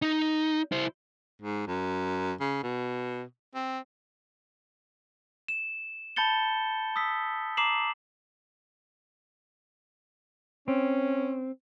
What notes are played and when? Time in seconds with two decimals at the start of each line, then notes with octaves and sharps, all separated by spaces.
0.02 D#4
0.72 E4 C5
1.42 G#2
1.67 F#2
2.40 C#3
2.63 B2
3.55 C4
5.48 E7
6.16 A5 B5 G6 A6 C#7 G7
6.96 D#6 E6 B6
7.57 A#5 D6 C7 E7 F#7
10.68 C4 C#4